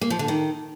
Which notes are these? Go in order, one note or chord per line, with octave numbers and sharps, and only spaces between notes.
A#3
F3
D3
D#3